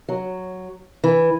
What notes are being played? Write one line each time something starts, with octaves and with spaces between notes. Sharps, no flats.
F#3
E3